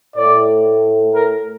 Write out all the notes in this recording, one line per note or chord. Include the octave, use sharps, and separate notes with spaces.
A2 A3 D5
A#4